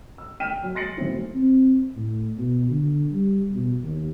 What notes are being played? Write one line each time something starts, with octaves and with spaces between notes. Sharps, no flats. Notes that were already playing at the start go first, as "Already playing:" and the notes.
E6
G5 F6 B6 D#7 E7
F#3
C6 A6 A#6 C7 C#7 F#7
E3 F#3 A3 C4 E4
C4
A2
B2
D3
G3
B2
D#2